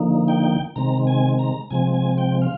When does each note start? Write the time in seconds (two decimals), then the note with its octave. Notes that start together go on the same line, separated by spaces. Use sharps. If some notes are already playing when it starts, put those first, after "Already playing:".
Already playing: D3 F3 A#3 D#4
0.28 G5
0.76 C3 D#3 G#3 C4 A#5
1.07 G#5
1.39 A#5
1.71 C3 F3 G#3 C4 G#5
1.94 G#5
2.18 G5
2.42 F5